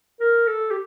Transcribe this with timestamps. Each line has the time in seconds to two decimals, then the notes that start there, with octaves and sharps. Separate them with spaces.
0.20 A#4
0.47 A4
0.71 G4